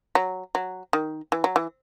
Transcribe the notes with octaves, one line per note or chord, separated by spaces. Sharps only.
F#3
F#3
D#3
E3
F#3
E3